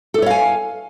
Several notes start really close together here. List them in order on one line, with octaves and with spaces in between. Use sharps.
A4 E4 C#5 F5 G#5